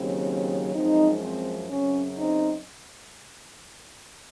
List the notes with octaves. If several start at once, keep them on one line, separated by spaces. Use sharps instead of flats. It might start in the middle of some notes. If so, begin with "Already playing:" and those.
Already playing: D#2 C#3 F#3 C4
F#2 F3 G#3 C4 D#4
C4
F#2 C#3 F#3 C4 C#4
C4 D#4